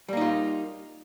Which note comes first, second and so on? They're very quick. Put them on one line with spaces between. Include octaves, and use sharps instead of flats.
G3 A#3 D#4 F4